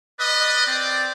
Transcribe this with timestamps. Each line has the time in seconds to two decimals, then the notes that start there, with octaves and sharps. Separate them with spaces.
0.19 B4 D5 D#5
0.66 C4 D5